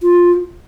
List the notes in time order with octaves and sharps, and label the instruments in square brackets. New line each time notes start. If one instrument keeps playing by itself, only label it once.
[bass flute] F4